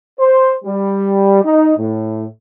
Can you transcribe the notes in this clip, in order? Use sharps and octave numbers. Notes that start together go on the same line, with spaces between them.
C5
G3
D#4
A2